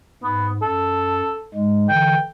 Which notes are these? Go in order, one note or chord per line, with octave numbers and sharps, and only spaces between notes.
G#2 B3
F#2 A4
G#2 G#3
D3 E3 G5